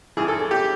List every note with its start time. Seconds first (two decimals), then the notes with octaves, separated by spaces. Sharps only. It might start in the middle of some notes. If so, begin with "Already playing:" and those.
0.17 G2 E3 G#4
0.28 A4
0.51 G4